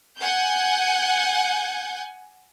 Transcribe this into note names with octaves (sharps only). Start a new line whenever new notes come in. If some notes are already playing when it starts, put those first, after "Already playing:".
F#5 G#5 G6